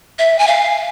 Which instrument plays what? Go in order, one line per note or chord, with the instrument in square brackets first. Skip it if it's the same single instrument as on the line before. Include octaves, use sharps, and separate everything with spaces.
[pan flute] E5
G#5
F5